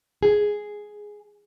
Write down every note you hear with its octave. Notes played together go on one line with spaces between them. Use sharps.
G#4